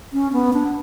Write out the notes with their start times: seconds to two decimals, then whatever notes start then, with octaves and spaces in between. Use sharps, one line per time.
0.13 C#4
0.33 B3
0.53 D4